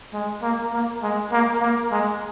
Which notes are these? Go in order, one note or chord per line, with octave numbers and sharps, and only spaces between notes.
G#3
A#3
A#3
G#3
A#3
A#3
G#3